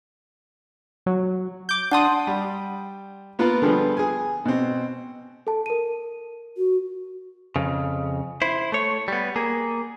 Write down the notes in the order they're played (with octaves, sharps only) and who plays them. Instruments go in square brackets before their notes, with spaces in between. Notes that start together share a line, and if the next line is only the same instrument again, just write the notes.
[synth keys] F#3
D6 G6
[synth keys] D4 D#6 [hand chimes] F#5 A5 C6
[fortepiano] G3
A#3 B3 F4 A#4 B4
D3 F3 G3 B3 G#4 B4
G#4 G#5
B2 C4
[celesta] A4 A5
A#4 D#7
[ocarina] F#4
[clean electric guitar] F2 C#3
E4 C5
A3 C#5
G3 B3
A#3 G#4